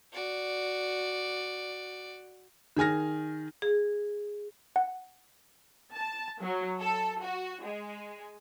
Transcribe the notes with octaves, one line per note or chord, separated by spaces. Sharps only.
F#4 D5
D#3 G#4 G#5 F6 A#6
G#4
F#5
A5
F#3
A4
F#4
G#3